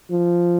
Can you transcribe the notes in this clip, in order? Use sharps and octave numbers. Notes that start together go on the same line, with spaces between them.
F3